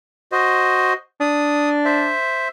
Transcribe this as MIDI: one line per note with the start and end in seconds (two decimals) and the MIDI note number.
0.32 0.93 66
0.32 0.93 72
0.32 0.93 75
1.20 2.13 62
1.20 1.69 87
1.85 2.48 72
1.85 2.48 76